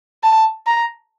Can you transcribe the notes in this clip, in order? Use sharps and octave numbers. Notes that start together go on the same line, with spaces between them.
A5
A#5